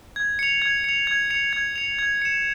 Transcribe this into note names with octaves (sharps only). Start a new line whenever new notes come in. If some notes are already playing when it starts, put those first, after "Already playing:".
G#6
C#7 F7
G#6
C#7 F7
G#6
C#7 F7
G#6
C#7 F7
G#6
C#7 E7